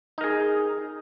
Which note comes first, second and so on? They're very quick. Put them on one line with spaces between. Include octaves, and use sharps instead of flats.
D#4 A#4 G#4